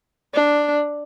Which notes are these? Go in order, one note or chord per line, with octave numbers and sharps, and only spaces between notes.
D4